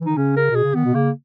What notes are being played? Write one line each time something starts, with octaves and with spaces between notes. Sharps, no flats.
E3
D#3 D#4
C#3 C#4
A#4
B2 G#4
C#3
D#3 B3
B2
C#3 A#3